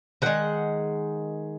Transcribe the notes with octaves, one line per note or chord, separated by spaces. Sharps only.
D#3 G#3 F#5